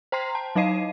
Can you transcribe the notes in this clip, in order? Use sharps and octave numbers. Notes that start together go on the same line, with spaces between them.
C5 G5 A#5 C6 C7
A5
F#3 D#4 D#5 F5 C7 D#7